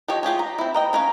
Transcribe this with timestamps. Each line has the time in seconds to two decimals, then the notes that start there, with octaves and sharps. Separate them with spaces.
0.08 F3 G4 C#5 D#5
0.23 F4 G4 G#4 C#5
0.39 A#5
0.58 C4 E4
0.74 A#4 D#5 G5
0.93 C#4 A#4 C#5 F5